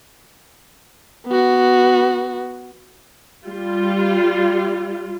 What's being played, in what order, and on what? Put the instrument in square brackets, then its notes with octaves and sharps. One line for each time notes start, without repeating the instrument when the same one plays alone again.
[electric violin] B3 F#4
[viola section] G3 F4